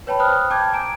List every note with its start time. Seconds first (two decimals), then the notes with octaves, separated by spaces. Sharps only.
0.07 B4 C#5 G5 A5 B5
0.19 C5 G5 B5 D#6 F6 F#6
0.50 G5 A5 D6 G6 G#6
0.73 G#5 A#5 D7